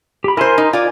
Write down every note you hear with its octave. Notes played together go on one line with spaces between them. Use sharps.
G4 B5
E4 A#4 C5 G#5 C6
D#4
F4 D5 G#5